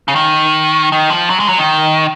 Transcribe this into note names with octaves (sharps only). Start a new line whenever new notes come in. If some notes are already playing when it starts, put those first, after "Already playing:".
C#3
D#3
D#3
F3
F#3
G#3
F#3
D#3